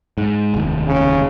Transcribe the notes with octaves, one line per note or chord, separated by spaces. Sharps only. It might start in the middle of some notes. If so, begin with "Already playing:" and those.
G#2
F1 D#2
C#3